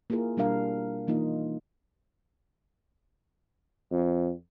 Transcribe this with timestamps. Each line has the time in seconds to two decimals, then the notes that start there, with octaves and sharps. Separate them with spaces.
0.10 A#3 E4 F4 G#4 A#4
0.37 B2 G3 D4 A#4 F5
1.07 E3 A#3 D#4 F4 D#5
3.92 F2